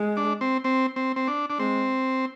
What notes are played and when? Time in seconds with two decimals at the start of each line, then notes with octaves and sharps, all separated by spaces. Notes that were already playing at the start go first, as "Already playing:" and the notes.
Already playing: G#3
0.17 D4
0.41 C4
0.64 C4
0.96 C4
1.16 C4
1.28 D4
1.50 D4
1.59 G#3 C4